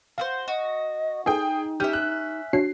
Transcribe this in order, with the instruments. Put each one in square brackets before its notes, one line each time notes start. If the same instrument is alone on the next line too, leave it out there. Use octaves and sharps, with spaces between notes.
[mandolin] F#4 A4 C5 [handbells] F5
[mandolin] F#4 [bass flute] D#5
[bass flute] D#4 [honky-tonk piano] G#4 G5 [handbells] A4
[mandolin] C#4 E5 [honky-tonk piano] G4 [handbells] G6
[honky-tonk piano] F#6
[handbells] D4 F#4 C#5 [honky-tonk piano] C7